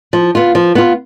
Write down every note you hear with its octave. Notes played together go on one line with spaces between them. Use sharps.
F3
B3 F4
F3
B3 F4